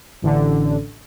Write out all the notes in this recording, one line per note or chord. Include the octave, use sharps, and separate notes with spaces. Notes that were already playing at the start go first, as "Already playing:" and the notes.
A1 D3